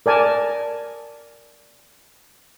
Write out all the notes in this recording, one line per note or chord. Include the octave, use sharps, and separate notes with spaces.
A#4 D5 G#5 A5